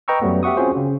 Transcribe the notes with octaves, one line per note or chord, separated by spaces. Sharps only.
B4 D#5 G5 A#5 C#6 E6
F#2 F#3 G3 A3 B3
G4 E5 F#5 C#6 D#6
C4 C#4 F4 F#4 G#4 C5
C#3